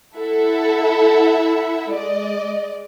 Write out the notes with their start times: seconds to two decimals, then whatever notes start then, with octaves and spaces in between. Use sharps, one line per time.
0.16 E4 A4 E5 F#5
1.91 G#3 D5 D#5